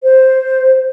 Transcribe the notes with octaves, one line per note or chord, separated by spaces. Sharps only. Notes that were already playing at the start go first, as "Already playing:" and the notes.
C5